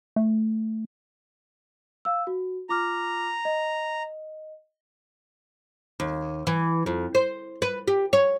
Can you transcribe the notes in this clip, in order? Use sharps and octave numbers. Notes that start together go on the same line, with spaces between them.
A3
F5 E6
F#4
F4 A#5 D6 F6
D#5
D#2
E3
F2
C5
B4
G4
C#5